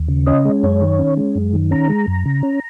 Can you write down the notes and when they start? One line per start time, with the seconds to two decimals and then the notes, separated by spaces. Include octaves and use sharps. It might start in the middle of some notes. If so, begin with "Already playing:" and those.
Already playing: D#2
0.08 C#3
0.27 C#4 D#5
0.45 G#3
0.63 F#2 C#5
0.82 D#3
0.99 C#4
1.17 G#3
1.35 F#2
1.53 D#3
1.71 C#4 A#5
1.89 G#3
2.08 F#2
2.26 C#3
2.43 C#4